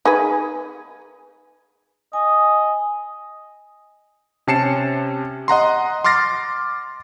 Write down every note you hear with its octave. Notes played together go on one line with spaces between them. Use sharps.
D#4 G#4 B4
D#5 G#5
C3 C#4 A5 C7 C#7 E7
D#5 F#5 A#5 C6
C6 D6 F6 A6 A#6 C7